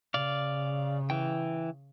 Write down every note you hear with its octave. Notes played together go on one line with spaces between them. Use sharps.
C#3 D5 F5
E3 G5